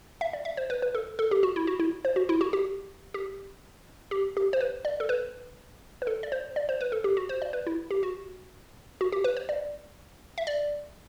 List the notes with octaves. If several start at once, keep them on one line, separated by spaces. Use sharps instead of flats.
E5
D5
E5
C5
B4
B4
A4
A4
G4
F#4
E4
F#4
E4
C5
F#4
E4
F#4
G4
G4
G4
G4
C5
B4
D5
A4
B4
B4
A4
D5
C5
D5
C5
B4
A4
G4
F#4
C5
D5
B4
E4
G4
F#4
F#4
G4
B4
C5
D5
E5
D5